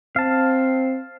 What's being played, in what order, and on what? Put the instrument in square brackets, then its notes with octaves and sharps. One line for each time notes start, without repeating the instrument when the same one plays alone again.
[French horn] C4 [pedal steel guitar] F5 A5